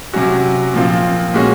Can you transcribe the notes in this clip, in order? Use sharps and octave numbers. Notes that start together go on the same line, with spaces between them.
C3 F#3 C#4 F#4
A#2 F3 C4 F4
A#2 G#3 C#4 F#4 C#5